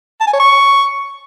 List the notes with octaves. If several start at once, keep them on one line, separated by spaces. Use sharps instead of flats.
A5
G#5
C#5
C#6